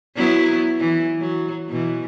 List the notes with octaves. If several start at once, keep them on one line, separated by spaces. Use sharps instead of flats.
F#3 B3 E4
E3
F#3
B2 E3